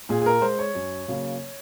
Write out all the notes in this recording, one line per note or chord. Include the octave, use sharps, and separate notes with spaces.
A#2 G#4
G#4
A#4
G#3 C5
C#5
F#2
C#3 F#3 A#3